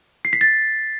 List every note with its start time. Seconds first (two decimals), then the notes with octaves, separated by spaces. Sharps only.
0.25 C7
0.33 B6
0.41 A6